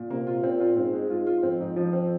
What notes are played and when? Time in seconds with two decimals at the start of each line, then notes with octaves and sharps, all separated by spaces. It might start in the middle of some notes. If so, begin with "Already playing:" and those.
Already playing: A#2
0.10 C3 A#3
0.27 F4
0.43 A#2 C4
0.60 F4
0.76 G#2 C4
0.93 G#3
1.10 G#2 F4
1.27 F4
1.43 F2 C4
1.60 G#2
1.76 F3
1.93 C4